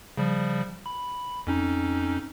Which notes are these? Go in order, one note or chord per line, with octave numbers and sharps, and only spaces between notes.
C#3 F3 G3
B5
F2 C#4 D#4